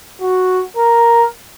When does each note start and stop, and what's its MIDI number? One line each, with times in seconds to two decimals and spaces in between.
0.21 0.63 66
0.77 1.26 70